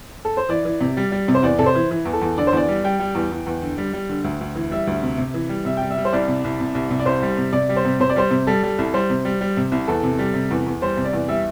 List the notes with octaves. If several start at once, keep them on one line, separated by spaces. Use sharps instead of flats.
A4
C5
E3 D5
E3
C3
G3
G3
C3
C5
E2 D5
C3 A4
C5
E3
E3
E2
A4
E2
D3 D5
C5
E2 D5
G3
G3 G5
G3
E2
E2
E2
D3
G3
G3
D3
D2
D2
E3
G3 E5
D2
C3
C3
E3
G3
C3 E5
G3 G5
E5
G3
C5
C2 D5
C3
C2
C3
C2
C3
D5
C2 C5
G3
C3
C3 D5
G3
C5
C3
C3 C5
D5
G3 C5
C3
G3 A4
G3
C2
G3 C5
C3
G3
G3
C3
C2
E2 A4
C3
G3
C3
E2
E2
G3 C5
C3
D5
E2
G3 E5